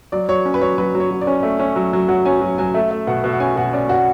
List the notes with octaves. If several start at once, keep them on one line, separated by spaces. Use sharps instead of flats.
F#3 D5
F#3 C#5
C#4
B4
F#3 C#5
F#3 B4
F#3
C#5
F#3
D5
C#4
A3
C#4
F#3
F#3
F#3 F#5
C#4 G#5
F#3
F#3 G#5
A3 E5
A3
B2 F#5
B2 E5
F#5
C#4 G#5
B2 F#5
C#4 D5
B2 F#4